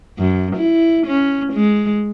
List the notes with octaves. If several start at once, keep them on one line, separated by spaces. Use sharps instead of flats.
F#2
E4
C#4
G#3